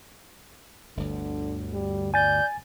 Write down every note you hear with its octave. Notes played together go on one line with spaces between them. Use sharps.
G1 D2 D3
G3
D5 G#5 G6 A6